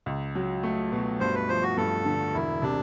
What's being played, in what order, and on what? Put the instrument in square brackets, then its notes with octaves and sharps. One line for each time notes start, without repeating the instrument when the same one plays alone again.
[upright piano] C#2
F#3
A3
B2
[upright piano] G2 [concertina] C5
[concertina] B4
[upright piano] F3 [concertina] C5
[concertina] F#4
[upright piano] G2 [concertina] A4
[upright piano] D3
[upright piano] E1 [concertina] E4
[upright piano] C3 [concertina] D4